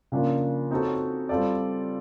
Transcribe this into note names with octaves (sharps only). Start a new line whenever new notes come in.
C#3 F3 A#3 D4 F4
C4 D#4 F#4 A4 C#5
G3 C4 F4 A4 D5